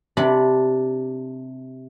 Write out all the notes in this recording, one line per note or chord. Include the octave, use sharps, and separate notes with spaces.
C3 D4 B5